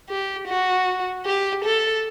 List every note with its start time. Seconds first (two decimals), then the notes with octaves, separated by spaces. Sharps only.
0.09 G4
0.48 F#4
1.26 G4
1.64 A4